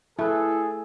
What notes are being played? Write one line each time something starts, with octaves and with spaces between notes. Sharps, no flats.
A3 E4 G#4 A4 B4